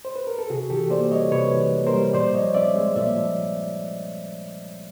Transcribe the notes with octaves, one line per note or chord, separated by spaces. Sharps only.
C5
B4
A#4
A4
C3 F#4 G#4
E3 G4 A4
A#3 C5 D5
G3 C#5 D#5
C3 B4 C#5
E3
A#3
A#4 C5
G3
A#2 C5 D5
F3 C#5 D#5
C4 D5 E5
G#3
A#2 D5 E5
F3